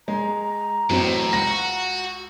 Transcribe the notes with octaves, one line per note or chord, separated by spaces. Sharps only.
G#3 A#5
A1 A2 F#3 C4
C#2 F#4 A#6